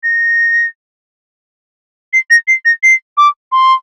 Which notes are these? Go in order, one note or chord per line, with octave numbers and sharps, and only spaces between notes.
A#6
C7
A#6
C7
A#6
C7
D6
C6